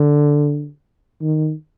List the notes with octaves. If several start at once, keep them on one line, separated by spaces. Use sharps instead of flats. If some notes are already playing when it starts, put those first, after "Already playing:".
Already playing: D3
D#3